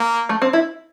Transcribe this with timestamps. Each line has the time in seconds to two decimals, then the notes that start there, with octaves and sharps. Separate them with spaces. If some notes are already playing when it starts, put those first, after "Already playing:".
Already playing: A#3
0.29 A3
0.42 C4
0.53 E4